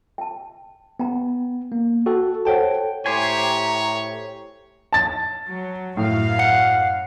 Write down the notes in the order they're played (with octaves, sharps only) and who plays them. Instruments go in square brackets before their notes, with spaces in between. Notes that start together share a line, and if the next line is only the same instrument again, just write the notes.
[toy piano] G5 A5
[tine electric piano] B3 [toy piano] G5 A#5
[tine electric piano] A#3
[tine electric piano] F#4 A4 [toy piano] G5
[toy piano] A4 C5 F#5 [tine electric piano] C#5 G5 A5
[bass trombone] A2 [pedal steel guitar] G4 C5 G#5 [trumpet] C#5 [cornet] A#5
[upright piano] A5 A6
[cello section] F#3
[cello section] F#2 F#3 F5 [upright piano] A2
[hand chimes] F#5 C#7